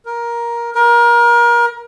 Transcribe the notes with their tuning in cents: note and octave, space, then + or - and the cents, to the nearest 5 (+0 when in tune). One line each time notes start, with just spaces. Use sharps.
A#4 +15
A#4 +30